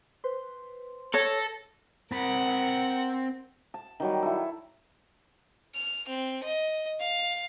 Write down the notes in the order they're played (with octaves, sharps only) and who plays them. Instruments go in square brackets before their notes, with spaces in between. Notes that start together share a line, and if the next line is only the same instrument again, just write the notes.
[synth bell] B4 C5 C6
[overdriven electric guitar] A4 [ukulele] C#5 [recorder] A#6
[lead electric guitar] C4 B5 [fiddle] A#4 F#5
[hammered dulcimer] A5
D#3 F#3 G3
E4 A4
[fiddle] F6
C4
D#5
F5